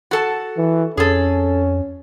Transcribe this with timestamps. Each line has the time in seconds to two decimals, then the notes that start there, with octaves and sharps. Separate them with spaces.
0.11 F#4 A4 A5
0.57 E3
0.97 F2 C#4 G#4 A4